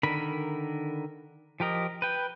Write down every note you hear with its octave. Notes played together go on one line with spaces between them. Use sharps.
D3 D#3 A#4 B5
F3 G4 A#4 D#5
B4 G5